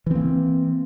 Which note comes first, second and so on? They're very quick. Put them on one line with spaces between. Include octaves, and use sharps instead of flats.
E3 C4 A#3